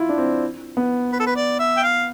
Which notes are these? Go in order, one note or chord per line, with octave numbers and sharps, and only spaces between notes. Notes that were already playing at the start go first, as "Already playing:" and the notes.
Already playing: E4 F4
D4
C4
B3
B4
A4
B4
D5
E5
G5
F5